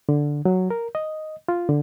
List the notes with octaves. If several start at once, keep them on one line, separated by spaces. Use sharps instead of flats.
D3
F#3
A#4
D#5
F4
D3